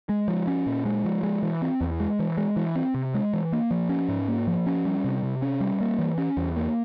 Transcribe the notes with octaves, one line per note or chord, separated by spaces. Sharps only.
G#3
F3
C#4
A#2
G#3
F3
G#3
E3
C4
E2
G#3
E3
G#3
E3
C4
C3
G#3
E3
A#3
F3
C#4
G#2
A#3
F3
C#4
G3
C3
C3
C#4
G3
A#3
E3
C#4
E2
A#3